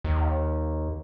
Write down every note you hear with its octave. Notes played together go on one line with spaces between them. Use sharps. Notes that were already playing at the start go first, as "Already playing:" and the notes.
D#2